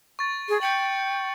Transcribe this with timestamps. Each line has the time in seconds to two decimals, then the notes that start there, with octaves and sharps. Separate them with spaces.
0.19 C#6 A6
0.49 G#4
0.61 G5 G6 C#7 F#7